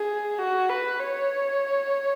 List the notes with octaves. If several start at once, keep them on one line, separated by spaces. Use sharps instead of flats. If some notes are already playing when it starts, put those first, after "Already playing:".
Already playing: G#4
F#4
B4
C#5